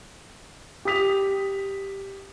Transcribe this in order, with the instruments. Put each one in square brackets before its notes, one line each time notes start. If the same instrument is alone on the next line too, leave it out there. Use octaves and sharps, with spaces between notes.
[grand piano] G4 D#6 B6 F7